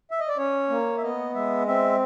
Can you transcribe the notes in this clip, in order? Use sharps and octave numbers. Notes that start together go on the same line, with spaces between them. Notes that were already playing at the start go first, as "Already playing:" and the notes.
E5
D#5
D5
C#4 C#5
A#3
E5
B3 D#5
G#3 E5
C4 E5